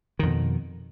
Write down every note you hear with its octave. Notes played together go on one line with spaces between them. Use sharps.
F2 B2 D#3